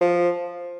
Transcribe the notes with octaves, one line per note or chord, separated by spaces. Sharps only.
F3